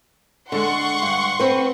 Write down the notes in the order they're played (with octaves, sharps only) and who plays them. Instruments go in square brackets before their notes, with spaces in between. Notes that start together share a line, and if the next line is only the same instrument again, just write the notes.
[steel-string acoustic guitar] D3 G#3 [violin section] F#5 C6 C#6
[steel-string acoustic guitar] G2
C4 B4